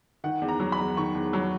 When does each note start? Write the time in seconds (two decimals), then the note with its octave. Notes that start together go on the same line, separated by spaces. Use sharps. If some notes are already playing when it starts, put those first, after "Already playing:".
0.24 D#3 F#5
0.42 E2
0.49 A#5
0.60 F#3
0.72 B5
0.79 E2
0.97 D#3 C#6
1.14 E2
1.33 F#3